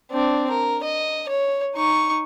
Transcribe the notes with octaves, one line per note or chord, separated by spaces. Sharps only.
C4 D4
A#4
D#5
C#5
D#4 C#6